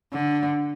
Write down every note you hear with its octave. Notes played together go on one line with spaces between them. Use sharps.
D3